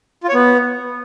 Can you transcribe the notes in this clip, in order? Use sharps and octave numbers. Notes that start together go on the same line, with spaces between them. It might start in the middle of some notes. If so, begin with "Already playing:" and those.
F4
C#5
B3